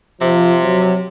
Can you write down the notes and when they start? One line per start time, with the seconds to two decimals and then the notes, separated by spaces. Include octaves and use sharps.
0.21 C3 F3
0.63 F#3